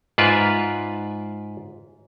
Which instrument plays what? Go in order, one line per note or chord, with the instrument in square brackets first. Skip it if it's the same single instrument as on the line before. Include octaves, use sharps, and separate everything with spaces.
[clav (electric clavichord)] G#2 F4 B4 D5 E5 G#5